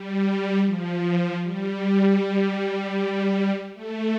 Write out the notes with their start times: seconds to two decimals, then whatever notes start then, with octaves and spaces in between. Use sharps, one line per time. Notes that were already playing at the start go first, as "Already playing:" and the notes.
Already playing: G3
0.66 F3
1.43 G3
3.74 A3